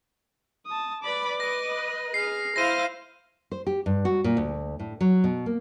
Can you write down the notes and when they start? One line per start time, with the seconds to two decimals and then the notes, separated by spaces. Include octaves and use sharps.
0.67 A5 D#6
1.03 B4 D5 B5 D6
1.40 B4 D#5 A#6
2.14 G#4 F6 C7
2.56 E4 C5 F5 A#6 D#7
3.52 C5
3.67 G4
3.86 G2
4.05 F#4
4.24 A#2
4.37 D2
4.80 A2
5.01 F#3
5.24 B2
5.46 A#3